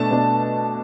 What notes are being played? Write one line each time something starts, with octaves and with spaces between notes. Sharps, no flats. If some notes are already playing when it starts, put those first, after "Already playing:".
Already playing: B2 A3 D4 A5
B2 A3 D4